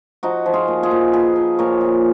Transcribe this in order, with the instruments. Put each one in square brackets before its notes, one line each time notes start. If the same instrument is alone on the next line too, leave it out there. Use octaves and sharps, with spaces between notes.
[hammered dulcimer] F3 D#4 F#4
F3
F4 G#4
A#2
F4 G#4
A#2
F3 G#4 B4
F3
A#2 A#4 C#5
A#2